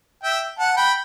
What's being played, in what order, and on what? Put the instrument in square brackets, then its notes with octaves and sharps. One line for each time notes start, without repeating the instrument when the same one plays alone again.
[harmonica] E5 G5
F#5 A5
A5
G5 B5